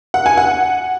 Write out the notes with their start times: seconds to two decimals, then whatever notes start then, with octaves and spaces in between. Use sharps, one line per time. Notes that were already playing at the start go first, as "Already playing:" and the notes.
0.14 F#5
0.26 G#5
0.37 F#5